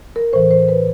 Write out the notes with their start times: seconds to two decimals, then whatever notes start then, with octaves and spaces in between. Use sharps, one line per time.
0.16 A#4
0.33 A2 E3 C5
0.51 C5
0.69 B4